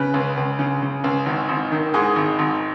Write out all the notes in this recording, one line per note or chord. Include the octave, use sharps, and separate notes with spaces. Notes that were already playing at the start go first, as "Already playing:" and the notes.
Already playing: C#3 B4
C#2
C#2
C#3
C#3
C#2
G#1
G#1
D#3
G#2 G#4
G#1
G#1